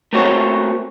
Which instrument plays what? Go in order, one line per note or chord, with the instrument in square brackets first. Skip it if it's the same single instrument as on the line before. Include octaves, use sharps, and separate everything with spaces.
[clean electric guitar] A3 A#3 C4 F#4 C#5